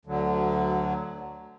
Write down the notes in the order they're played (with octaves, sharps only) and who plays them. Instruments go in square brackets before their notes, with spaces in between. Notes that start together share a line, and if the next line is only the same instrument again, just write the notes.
[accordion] D2 D3 F#3